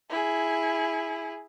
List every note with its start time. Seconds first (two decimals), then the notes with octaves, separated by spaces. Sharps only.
0.10 E4 G#4